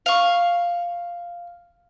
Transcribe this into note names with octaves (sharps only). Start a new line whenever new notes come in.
F5 C#6